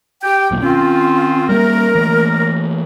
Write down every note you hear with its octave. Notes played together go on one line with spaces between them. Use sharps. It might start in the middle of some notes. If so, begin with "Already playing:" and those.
G4 G5
D#1 B1 A#2
D#3 C4 C#4 F4
G3 A#3 A#4
E3 A3 A#3